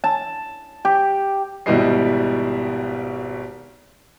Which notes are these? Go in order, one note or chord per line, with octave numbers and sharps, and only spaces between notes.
A5
G4
G#1 B2 G3 E4 D#5 C7